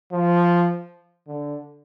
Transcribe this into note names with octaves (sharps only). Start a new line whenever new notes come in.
F3
D3